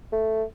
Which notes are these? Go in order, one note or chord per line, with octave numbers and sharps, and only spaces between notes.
A3